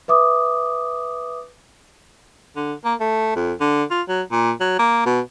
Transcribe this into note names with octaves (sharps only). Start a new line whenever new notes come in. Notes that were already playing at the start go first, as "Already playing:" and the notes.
B4 E5 D6 D#6
D3
A#3
A3
F2
D3
F4
F#3
A#2
F#3
A#3
B2